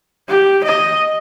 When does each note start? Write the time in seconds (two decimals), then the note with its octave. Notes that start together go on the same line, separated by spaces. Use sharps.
0.28 G4
0.64 D#5